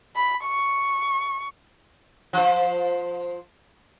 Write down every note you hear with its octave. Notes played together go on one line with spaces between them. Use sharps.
B5
C#6
F3 C5